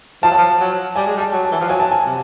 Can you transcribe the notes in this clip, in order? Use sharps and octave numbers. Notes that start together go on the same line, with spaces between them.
F3 A5
F#3
F3
F#3
G3 G#5
G#3
G3
A5
F#3
A5
E3
F3
F#3 G#5
A5
G#5
C3